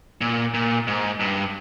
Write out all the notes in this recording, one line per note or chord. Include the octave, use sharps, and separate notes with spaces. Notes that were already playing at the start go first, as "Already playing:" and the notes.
A#2
A#2
G#2
G2